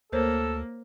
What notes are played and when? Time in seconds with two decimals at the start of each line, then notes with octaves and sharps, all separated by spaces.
0.12 D2 A#3 A4 A#4 C5 C#5